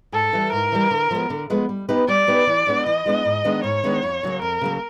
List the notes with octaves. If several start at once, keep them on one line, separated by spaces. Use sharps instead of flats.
G#2 A4
E3 G3
G#2 A#4
E3 G3
D3
F3 G#3 B3
D3
F3 G#3 B3
G3
B3 D#4 G4 B4
G3 D5
B3 D#4 G4 B4
E3
G#3 B3 D4
E3 D#5
G#3 B3 D4
G#2
D#3 G#3 B3 D4
G#2 C#5
D#3 G#3 B3 D4
F2
C#3 F#3 A#3
F2 A#4
C#3 F#3 A#3